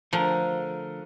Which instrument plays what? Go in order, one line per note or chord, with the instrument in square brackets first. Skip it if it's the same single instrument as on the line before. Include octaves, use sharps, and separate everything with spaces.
[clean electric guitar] D3 A3 A#4 [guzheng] F3